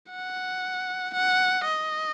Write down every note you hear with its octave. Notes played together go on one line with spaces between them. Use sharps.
F#5
F#5
D#5